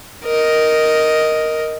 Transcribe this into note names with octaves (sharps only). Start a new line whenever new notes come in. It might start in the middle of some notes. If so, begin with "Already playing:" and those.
A#4 D#5